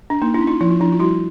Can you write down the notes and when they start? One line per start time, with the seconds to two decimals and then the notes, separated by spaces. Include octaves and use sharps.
0.10 D4
0.22 A#3 D#4
0.34 D4 E4
0.41 C#4
0.47 D#4 F4
0.61 F3 E4
0.71 F4
0.80 F3 D4 E4
0.92 F4
0.99 G3 E4 F#4